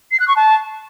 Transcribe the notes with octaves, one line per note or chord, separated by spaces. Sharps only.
C7
F#6
C#6
A5